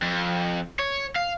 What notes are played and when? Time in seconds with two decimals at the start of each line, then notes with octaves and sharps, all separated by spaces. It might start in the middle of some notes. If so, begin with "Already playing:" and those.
0.03 F2
0.80 C#5
1.16 F5